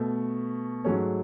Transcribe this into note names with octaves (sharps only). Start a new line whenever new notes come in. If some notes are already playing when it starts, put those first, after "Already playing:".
Already playing: B2 A3
G#2 F#3 A3 C#4 C#5